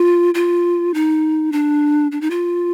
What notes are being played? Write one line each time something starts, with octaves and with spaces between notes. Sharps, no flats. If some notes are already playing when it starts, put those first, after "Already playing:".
Already playing: F4
F4
D#4
D4
D4
D#4
F4